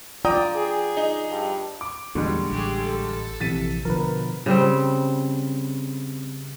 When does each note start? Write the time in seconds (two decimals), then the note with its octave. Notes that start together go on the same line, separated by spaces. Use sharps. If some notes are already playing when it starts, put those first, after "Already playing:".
0.25 F4 D5 G5 A#5 D#6
0.55 G#4
0.97 D#4
1.31 G2
1.81 D6
2.15 E2 A#2 D3 G3 G#3 C#6
2.51 A1 G4 G#4
2.82 A4
3.40 A#1 C3 E3 A6 B6 D#7
3.85 B2 D3 F3 A#4 B4
4.46 C#3 G3 C4